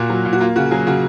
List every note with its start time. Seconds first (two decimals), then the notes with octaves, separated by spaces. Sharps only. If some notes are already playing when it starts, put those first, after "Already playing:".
Already playing: A#2 A#3 F#4
0.10 F#3
0.25 A#2
0.33 F#4
0.40 A#3 F4
0.56 C#3 F#4
0.71 F#3 G#4
0.87 C#3 F#4